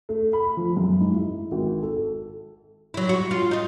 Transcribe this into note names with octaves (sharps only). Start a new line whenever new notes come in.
A3
B5
F3
F#2
G#2
E4
G#1
A4
F#3 E4
F#4
F4
D#4 F4